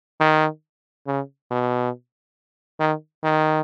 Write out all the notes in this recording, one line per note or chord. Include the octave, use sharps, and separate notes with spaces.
D#3
C#3
B2
D#3
D#3